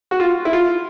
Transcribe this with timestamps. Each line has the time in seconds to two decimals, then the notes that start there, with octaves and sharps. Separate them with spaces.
0.11 F#4
0.20 F4
0.45 E4
0.53 F4